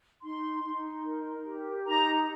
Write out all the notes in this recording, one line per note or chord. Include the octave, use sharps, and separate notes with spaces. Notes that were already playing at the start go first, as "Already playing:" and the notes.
D#4 C6
D#4
A#4
G4
D#4 A#5